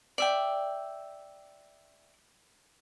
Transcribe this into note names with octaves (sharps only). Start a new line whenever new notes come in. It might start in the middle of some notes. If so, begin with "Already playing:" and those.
D5 E5 G5